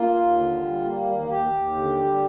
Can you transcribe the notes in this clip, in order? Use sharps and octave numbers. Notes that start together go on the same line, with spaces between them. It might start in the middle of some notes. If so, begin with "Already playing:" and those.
Already playing: A#3 F4
D#2
D3
G3
A#3
D#2
D#2 G4
D#2
D3
G3